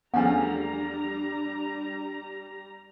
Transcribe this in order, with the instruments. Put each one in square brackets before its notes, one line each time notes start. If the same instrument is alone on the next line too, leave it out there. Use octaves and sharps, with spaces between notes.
[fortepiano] E2 F3 A3 [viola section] G3 A#5 [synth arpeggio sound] B3 C#4 [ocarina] D4